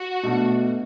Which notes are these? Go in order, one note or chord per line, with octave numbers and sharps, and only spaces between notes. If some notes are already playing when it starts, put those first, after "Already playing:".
Already playing: F#4
B2 A3 D4